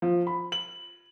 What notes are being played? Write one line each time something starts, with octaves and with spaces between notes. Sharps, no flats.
F3
B5
F#7